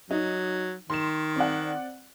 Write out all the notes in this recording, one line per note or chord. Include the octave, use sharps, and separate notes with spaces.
F#3 D#4
D#3 C6 E7
C4 D5 F#5